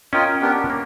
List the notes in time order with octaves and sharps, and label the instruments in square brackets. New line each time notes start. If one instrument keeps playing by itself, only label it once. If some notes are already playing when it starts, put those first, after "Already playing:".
[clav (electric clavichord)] C#4 [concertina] F4 A#4 D#5 G5
[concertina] B3 D4 G4 A#4
[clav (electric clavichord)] A#3